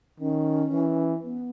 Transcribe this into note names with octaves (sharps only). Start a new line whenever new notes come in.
D#3 C#4
E3
B3